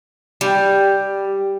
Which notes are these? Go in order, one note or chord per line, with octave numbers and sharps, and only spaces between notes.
G3